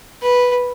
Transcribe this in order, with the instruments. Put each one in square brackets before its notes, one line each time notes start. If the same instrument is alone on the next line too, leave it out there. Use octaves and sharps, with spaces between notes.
[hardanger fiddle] B4